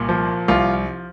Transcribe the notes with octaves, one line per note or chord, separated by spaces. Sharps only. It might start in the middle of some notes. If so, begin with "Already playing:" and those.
Already playing: C2 A#2
F3
C2 F4